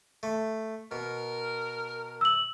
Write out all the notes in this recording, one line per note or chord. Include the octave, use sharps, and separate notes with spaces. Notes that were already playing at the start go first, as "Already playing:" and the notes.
A3
B2 A#4
E6 F#7